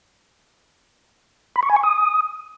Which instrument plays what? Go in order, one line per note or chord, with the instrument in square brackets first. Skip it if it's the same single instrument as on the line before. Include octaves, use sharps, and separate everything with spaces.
[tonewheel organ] B5
C#6
G#5
C#6
D#6